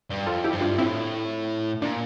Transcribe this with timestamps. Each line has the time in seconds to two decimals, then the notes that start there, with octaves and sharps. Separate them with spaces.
0.10 G2
0.26 F2 F4 A4
0.44 E4 G4
0.52 G2
0.61 D4 F4
0.78 A2 C4 E4
1.82 A#2 D4